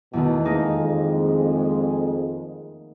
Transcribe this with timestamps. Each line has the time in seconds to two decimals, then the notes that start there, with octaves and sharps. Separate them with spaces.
0.13 E2 B2 D#3 A3
0.45 F2 G#3 A#3 D#4 G#4